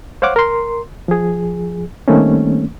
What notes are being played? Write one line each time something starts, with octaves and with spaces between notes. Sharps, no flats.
C5 C#5 F5 F#5 D6
A#4 C6
F3 G#4
D#3 G3 A3 A#3 C4 C#4